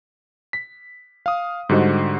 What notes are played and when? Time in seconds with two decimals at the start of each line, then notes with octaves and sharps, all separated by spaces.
0.53 B6
1.26 F5 D#6
1.69 G#2 D3 G3 F#4 C5 D#5